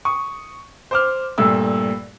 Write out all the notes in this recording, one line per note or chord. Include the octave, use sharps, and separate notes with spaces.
C#6 D#6
C5 D6 F6
G2 A#2 A3 E6